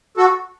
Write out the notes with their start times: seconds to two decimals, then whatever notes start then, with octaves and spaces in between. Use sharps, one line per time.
0.17 F#4 A4